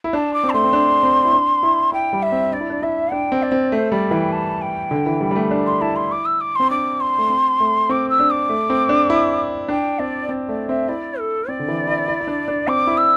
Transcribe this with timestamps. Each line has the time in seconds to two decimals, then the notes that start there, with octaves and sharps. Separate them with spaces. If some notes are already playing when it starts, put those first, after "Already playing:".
0.04 E4
0.13 D4 A5
0.33 D6
0.44 C4
0.49 A5
0.53 A3 C6
0.64 C4
0.73 D4
1.03 C4
1.25 E4
1.33 D4
1.63 E4
1.92 E4 G5
2.13 G3
2.22 E5
2.32 C4
2.52 D4 D5
2.61 E4
2.70 D4
2.82 E4 E5
3.11 D4 G5
3.32 C4
3.42 D5
3.52 C4
3.71 A3 C5
3.92 G3 D5
4.11 E3 G5
4.32 A5
4.61 G5
4.91 D3
5.06 E3
5.21 G3
5.31 G3
5.36 A3
5.51 D4
5.66 C6
5.81 E4 A5
5.96 C6
6.11 D6
6.25 E6
6.40 D6
6.55 C4 C6
6.70 D4 D6
7.00 C6
7.18 A3
7.30 C4
7.60 A3
7.89 C4 D6
8.09 E6
8.20 D4
8.30 D6
8.49 A3
8.70 C4
8.89 D4
9.10 E4
9.69 D4 G5
9.99 C4 D5
10.29 C4
10.49 A3 D5
10.68 C4 E5
10.88 E4 D5
11.19 A4
11.48 C4 D5
11.59 D3
11.68 E3
11.88 E4
12.08 E4
12.21 E4
12.27 D4
12.48 D4
12.68 C4 D6
12.87 E4
12.97 E6